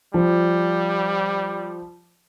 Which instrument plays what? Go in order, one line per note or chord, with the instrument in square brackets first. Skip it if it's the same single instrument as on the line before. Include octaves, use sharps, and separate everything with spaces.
[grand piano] F3 [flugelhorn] G3